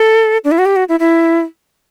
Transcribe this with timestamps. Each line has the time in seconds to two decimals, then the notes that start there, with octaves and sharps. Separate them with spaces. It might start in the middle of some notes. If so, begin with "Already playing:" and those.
Already playing: A4
0.44 D4
0.51 E4
0.58 F#4
0.66 G4
0.76 F#4
0.89 E4
1.00 E4